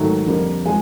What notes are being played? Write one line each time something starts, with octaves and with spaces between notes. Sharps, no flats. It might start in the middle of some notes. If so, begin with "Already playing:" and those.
Already playing: G#2 D#3 F#3 A3
F2 D3 G3 A#3
F3 G#3 G#5